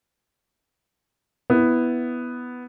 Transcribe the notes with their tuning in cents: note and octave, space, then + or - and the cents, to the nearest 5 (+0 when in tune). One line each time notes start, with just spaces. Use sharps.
B3 +0 E4 +0